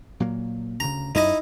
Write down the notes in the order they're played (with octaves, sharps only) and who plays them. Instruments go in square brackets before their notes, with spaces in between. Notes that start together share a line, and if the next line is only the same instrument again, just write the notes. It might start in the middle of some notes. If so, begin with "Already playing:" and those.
[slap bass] A#2 F#3 A#3
[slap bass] D2 C#3 [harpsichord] A#5
[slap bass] F#2 [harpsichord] D#4 E4 D#5